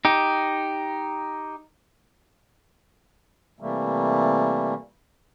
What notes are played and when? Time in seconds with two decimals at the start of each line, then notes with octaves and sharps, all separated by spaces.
0.05 D#4 G4
3.60 C3 E3 G3 A3 A#3